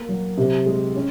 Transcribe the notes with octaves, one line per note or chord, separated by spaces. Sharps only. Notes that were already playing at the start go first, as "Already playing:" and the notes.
Already playing: A#3
F#3
C3
G#3
C#4